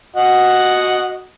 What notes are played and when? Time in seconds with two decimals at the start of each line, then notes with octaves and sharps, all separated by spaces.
0.16 F#4 D#5 F#5